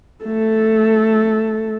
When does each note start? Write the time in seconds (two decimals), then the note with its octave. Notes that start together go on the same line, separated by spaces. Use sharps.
0.25 A3 A4